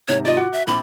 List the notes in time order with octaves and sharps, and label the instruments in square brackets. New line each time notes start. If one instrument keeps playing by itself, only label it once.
[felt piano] G#2 C3 D#3 [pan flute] C#5
[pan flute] F4 [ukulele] D5 D#5
[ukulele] F#4 [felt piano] F#5 D6 F#6
[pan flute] E5 [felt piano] F#6
[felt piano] A#1 C4 D6 [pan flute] B5